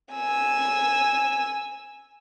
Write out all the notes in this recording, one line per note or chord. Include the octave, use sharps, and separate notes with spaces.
G#5 E6